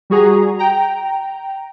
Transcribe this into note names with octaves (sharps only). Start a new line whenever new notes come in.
G3 F#4 G#4 A#5
G5 A#5